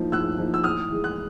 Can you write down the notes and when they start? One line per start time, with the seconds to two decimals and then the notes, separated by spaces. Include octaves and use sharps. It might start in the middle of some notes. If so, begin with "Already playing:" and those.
Already playing: A2 F3 A#3 D#4
0.12 A2 E6 F#6
0.38 F3 A#3 D#4
0.54 E6
0.64 A2 D#6 F6
0.90 E3 G#3
1.04 F#6